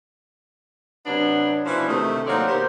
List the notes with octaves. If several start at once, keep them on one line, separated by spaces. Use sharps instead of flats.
C3 F#3 B3 D4
B2 E3 F3 C#4 D4 E4
D2 C3 D#3 A3
F#3 A#3 C4 D#4 C#5 D5
B2 D#3 G4 C5